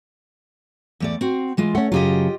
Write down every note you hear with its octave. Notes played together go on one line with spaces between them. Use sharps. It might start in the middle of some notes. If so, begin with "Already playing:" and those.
E2 A3 D5
C4 F#4
E3 G#3 F4
A3 C#4 F#5
F#2 C#3 F#3 F4 G4 D#5